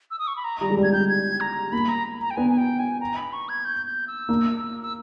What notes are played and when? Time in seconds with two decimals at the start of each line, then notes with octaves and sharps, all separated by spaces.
0.11 E6
0.19 D#6
0.27 C#6
0.36 B5
0.44 A#5
0.61 G3 A#5
0.70 G#3
0.77 G3
0.83 G#6
0.93 G3 G6
1.09 G#6
1.40 A#5
1.72 A#3 B5
1.89 A#5
2.21 A#5
2.31 G5
2.36 B3 G#5
2.50 G#5
2.58 G5
2.79 G#5
3.01 A#5
3.16 B5
3.33 C#6
3.49 G#6
3.65 G6
3.86 G6
4.08 E6
4.29 A#3
4.82 E6